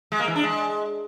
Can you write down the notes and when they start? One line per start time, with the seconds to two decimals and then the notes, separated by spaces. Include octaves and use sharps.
0.12 G#3
0.20 A#3
0.28 E3
0.36 D4
0.44 G#3